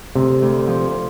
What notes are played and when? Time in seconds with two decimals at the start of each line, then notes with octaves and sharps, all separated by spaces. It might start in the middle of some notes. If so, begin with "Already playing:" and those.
0.15 D2 C3
0.42 D2
0.67 F3